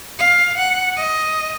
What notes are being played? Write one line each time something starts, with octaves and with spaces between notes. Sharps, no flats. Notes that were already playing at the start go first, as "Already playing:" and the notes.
F5
F#5
D#5